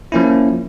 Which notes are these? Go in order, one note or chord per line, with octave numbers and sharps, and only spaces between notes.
F3 A#3 C#4 E4